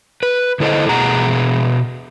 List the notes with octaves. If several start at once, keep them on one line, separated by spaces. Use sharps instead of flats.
B4
D3 E4 A4 C5 D#5
B2 G#4 F#5 A#5